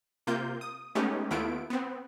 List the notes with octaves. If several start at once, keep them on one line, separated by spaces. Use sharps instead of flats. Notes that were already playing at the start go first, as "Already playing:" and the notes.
C3 A#3 F4 G6
D#6
G#3 A3 B3 C#4 D#4 G4
D#2 A3 B3 E4 F4 D7
B3 C4